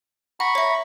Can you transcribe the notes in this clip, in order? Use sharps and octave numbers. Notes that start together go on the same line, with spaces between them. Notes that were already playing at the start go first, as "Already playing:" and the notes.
F#5 A#5 B5 C#6
C#5 E5